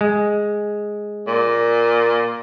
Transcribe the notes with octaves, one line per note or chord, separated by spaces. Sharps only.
G#3
A#2